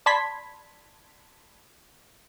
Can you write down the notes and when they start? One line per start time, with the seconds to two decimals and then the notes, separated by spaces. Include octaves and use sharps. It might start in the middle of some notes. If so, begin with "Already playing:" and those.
0.06 D5 A5 B5 C6 G#6 B6